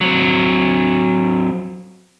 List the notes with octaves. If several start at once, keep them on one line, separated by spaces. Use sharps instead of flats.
F#3 C4